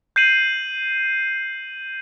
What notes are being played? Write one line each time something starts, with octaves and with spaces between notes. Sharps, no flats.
G6 C7 D#7 F#7